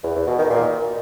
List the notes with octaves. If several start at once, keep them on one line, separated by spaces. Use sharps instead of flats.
E2
E2
B2
D#3
A#2